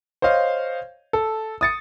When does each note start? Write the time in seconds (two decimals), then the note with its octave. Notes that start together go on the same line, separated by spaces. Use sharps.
0.22 C5 C#5 D#5 F5
1.13 A4
1.61 D#6 A6 C#7